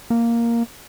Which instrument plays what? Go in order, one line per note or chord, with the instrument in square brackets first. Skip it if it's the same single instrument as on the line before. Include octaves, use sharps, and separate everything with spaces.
[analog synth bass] A#3